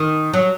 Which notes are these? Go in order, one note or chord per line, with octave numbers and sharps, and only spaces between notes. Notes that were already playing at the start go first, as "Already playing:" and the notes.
Already playing: D#3
F#3